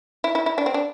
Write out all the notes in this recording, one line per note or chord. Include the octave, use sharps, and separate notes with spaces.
E4
E4
E4
D4
C4
D4